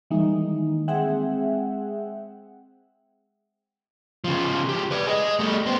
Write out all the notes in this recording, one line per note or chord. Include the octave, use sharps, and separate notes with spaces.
D#3 E3 G3 G#3 A#3 D#4
G#3 C4 G#4 E5 F#5 G5
C#3 F3
C#2 G4
B4 D5
G#4 D#5
G3 A3
B3 C5